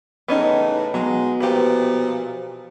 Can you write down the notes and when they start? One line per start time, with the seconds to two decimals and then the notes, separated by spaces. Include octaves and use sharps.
0.28 A2 C#3 E3 B3 C#4 D#4
0.94 B2 F#3 G#3
1.40 A#2 E3 F3 G4 B4